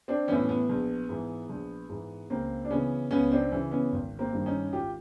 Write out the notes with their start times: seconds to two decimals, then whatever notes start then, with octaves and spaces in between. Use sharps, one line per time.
0.08 C4 D4
0.28 A2 E3 B3 C#4
0.49 B3
0.69 A#1
1.09 G#2 E3
1.49 A#1
1.89 G#2 E3
2.30 C#2 A#3 C4
2.64 D4
2.70 C#3 E3 B3 C#4
3.11 C#2 B3 C#4
3.31 C4 D4
3.52 C#3 E3
3.71 B3 C#4
3.92 G#1
4.19 A#3 C4
4.33 G2 D#3
4.46 C#4 D#4
4.73 G#1 F4 G4